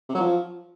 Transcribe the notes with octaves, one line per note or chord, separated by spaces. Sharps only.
C3
F#3
F3